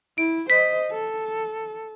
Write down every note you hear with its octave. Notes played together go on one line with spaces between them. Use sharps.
E4 D7
C5 D#5 B6
A4